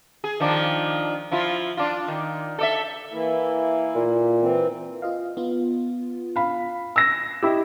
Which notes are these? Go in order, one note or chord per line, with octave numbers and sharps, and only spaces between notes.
G#4
D#3 F3 D4
F3 E4 F4
D4 F4
D#3
A4 D5 E5
E3 A#3 E4
A#2
E3 C4
F4 D#5 F5
B3 F4
F5 B5
E6 A#6
E4 G4 D#5 E6